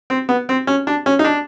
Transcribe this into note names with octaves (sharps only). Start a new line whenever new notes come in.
C4
B3
C4
C#4
D4
C#4
D#4
D4